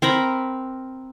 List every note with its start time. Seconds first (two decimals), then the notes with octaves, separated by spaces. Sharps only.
0.02 C4 A#4 A#5 B5